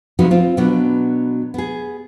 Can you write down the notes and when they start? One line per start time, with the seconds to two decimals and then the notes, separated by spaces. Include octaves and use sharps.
0.19 C3 F3 F#3 D#4 F#4 B4
0.31 C4 F4
0.57 B2 F#3 B3 D4
1.54 B3 G#4